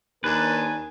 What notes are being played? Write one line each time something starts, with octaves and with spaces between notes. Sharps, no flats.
D#2 D4 A#4 B4 G#5